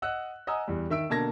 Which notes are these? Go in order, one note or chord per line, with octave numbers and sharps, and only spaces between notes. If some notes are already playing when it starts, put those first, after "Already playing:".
D#5 F#5 E6 F#6
D#5 F#5 G#5 A#5 D#6 E6
E2 G3
D#3 E5 E6 D7
B2 D3 A#3 A5 G#6 A#6